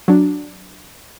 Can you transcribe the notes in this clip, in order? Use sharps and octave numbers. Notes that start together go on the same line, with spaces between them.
F#3 D4